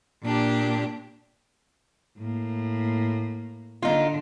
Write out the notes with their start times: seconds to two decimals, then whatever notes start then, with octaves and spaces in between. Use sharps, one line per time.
0.23 A#2 D4 G4
2.18 A2 A#3
3.82 D3 D#4 F4